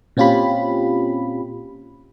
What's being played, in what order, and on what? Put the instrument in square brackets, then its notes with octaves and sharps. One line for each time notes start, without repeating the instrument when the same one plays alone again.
[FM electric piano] A#2 C4 C#4 F4 G4 B5